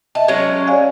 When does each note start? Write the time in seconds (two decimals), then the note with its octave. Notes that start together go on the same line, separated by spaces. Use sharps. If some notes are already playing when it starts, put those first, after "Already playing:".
0.15 D#5 E5 A5
0.28 F#3 G#3 C#4
0.67 D5 F5 G#5